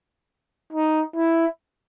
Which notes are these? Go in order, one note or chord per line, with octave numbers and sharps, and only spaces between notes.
D#4
E4